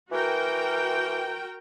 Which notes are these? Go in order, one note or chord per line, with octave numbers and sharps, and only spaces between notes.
E3 F#4 A#4 G5